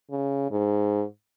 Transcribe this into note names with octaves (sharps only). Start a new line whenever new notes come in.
C#3
G#2